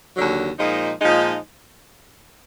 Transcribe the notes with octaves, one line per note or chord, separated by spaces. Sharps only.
D#2 D3 F#3
A#2 F3 G#3 D#4
A#2 F3 G#3 D#4